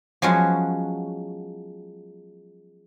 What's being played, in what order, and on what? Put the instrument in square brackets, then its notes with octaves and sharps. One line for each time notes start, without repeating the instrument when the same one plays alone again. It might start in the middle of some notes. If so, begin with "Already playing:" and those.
[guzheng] F3 F#3 G#3 B3 C#4 F#4